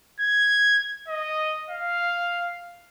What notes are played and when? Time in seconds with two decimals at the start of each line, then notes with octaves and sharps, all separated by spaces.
0.20 G#6
1.08 D#5
1.70 F5